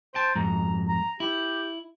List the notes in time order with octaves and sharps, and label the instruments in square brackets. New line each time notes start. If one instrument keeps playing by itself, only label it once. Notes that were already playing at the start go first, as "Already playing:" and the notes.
[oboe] C5 [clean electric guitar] G5 A5
[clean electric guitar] F2 G#2 [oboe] A#5
[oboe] A#5
[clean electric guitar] E4 [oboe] G4